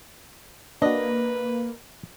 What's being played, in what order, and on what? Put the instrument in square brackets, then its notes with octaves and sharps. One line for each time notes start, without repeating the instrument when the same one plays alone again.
[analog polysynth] A#3 [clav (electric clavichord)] D4 F#4 [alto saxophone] B4 [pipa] D#5